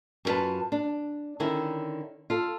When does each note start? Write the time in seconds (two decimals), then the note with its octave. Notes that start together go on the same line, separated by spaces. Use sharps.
0.25 F#2 A#3 F4 B4 A5
0.72 D4
1.40 D3 D#3 C#4 E4
2.30 F4 A4